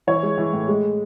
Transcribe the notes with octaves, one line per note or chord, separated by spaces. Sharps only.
E3 C#5
G#3
E3
A2
G#3